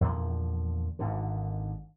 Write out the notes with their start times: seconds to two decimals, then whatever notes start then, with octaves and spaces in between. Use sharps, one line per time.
0.01 E2 A#2 D3 F3
0.99 G#1 G#2 D3